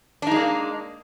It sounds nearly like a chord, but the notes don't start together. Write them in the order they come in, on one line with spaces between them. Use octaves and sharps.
D4 D#4 G#3 A#3